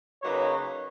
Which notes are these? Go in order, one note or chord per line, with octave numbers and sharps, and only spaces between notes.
C#3 F#3 A#3 D#4 B4 C#5